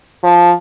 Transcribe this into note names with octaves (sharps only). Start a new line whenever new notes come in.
F3